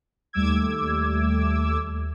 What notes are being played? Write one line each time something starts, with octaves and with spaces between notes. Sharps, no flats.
D#2 G3 A3 D6 E6 G#6